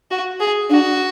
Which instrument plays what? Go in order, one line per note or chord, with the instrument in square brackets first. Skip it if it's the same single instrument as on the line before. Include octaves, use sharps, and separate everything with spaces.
[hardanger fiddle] F#4
G#4
[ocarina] D4 [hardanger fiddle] F#4